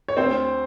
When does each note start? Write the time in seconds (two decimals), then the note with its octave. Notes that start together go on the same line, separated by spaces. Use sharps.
0.08 C#5
0.17 D2 C4 C5